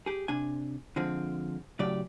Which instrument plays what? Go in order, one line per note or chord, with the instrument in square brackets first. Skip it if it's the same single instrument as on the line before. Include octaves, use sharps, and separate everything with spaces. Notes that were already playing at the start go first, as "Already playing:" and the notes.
[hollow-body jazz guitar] G4 G#4
C3 D4 G#5
D3 F3 G#3 C4
A2 C#3 F#3 G4 D5